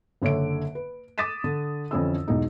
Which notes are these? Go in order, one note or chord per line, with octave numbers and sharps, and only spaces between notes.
F#1 D3 C#5 E5 D7
B4
D6 D#6 A6 B6 D#7 E7
D3
F2 D3 E3 C#4 E4 E6
B1 E2 B2 G#3 D#4